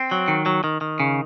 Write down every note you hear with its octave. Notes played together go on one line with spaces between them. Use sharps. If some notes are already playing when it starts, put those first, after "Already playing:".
Already playing: C4
F#3
D#3
F#3
D#3
D#3
C#3